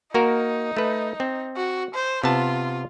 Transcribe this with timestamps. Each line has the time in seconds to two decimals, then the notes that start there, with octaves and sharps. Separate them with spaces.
0.14 A#3 D#4 F#4 A#4
0.77 A3 B4
1.20 C4
1.57 F#4
1.94 C5
2.24 C3 B3 F4 A5